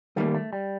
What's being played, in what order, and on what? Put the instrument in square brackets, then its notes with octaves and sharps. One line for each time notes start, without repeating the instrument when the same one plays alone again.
[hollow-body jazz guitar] D#3 G3 A#3 [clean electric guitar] A3
[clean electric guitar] A3
G3